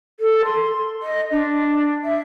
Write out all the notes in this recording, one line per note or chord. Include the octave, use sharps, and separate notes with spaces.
A4
C6
D#5
D4
E5